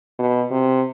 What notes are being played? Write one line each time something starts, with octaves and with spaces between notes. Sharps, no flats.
B2
C3